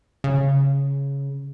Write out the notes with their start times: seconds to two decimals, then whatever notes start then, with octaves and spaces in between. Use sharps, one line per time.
0.24 C#3